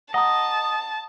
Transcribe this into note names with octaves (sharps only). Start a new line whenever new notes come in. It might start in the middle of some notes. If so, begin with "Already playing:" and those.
D#5 F#5 A5 A#5 D#6